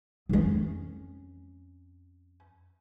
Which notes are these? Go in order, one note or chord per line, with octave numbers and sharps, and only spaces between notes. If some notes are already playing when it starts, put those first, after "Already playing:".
F2 C#4